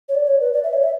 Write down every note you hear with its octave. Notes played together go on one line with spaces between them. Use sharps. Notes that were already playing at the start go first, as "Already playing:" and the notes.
C#5
D5
C#5
B4
D5
E5
C#5
E5